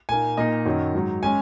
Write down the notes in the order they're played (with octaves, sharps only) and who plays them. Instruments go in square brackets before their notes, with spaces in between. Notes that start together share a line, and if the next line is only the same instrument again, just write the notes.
[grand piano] A#2 A#3 D#4 G#5
A#2 A#3 D#4 D#5
F#2 D#3 F#3
G#2 F#3 D#4
G#3 C#4 G#5